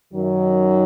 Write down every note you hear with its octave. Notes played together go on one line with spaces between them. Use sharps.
F#2 D#3 F#3